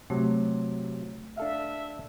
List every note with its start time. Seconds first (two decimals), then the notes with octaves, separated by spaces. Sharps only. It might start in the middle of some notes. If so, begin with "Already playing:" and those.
0.10 C3 F#3 A3
1.37 D4 A4 E5 F5